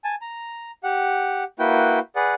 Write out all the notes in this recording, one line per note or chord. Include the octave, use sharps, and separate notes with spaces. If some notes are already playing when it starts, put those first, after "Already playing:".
G#5 A5
A#5
G4 F#5
A#3 E4 F#4 B4 G5
G#4 B4 D5 F#5